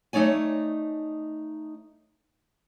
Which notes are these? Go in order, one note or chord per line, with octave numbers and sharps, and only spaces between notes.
A3 D#4 C#5 D5 G#5